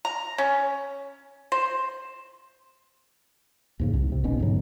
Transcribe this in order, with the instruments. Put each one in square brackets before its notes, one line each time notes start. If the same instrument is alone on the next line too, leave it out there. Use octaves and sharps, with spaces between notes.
[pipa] A#5
C#4
C5
[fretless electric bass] D#2 G#2 C#3
C2
C3
D#1 B1 B2 C#4
E2 G#2 D3 F#3